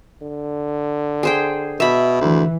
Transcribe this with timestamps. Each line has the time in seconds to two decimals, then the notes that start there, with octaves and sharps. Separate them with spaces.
0.22 D3
1.23 G#4 C5 G5
1.80 B2 E5 B5
2.21 D2 E3